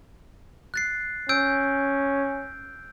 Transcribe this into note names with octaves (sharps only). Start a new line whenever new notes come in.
F#6 A6 C7
C#4 E6 G6 D7